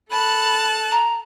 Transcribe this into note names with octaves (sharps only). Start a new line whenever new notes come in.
A4 A5 B5 F#6
A#5